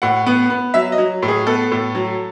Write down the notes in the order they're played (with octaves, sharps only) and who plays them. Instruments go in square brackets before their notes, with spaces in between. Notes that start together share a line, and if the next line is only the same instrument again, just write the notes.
[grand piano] A2 F#5
B3
B3
F#3 E5
D#5
F#3
A2
G#4
B3 A4
A2
F#3